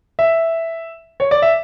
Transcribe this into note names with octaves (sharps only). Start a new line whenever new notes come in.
E5
C#5
D5
E5